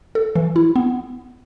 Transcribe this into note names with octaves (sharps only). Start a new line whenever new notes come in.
A4
E3
E4
B3